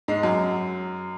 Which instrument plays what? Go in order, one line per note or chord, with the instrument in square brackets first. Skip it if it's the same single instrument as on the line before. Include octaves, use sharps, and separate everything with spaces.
[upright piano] G#2 G#3
F#2 F#3